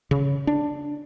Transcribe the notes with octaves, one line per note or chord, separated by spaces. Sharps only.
C#3
D4